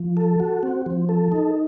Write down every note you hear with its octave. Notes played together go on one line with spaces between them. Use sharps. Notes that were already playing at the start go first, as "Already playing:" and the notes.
Already playing: F3
A4
F#4
C4
F3
A4
D#4